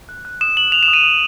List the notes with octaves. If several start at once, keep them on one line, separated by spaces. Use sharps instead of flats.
F#6
F#6
D#6 E7
D#6 F#7
D#6 F7
E7
D#6
D#7
D#6